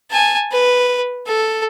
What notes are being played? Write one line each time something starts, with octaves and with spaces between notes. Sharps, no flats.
G#5 A5
B4
A4